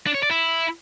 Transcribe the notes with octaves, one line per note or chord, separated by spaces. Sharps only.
D4
C#5
D5
E4